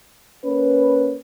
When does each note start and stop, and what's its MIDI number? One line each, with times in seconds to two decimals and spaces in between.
0.45 1.16 58
0.45 1.16 61
0.45 1.16 71